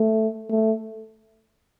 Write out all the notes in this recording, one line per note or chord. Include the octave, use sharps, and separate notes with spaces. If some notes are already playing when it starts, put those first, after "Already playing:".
Already playing: A3
A3